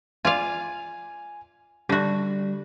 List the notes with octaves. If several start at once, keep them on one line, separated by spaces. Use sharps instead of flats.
F4 D5 F5 G#5
D3 G3 F#4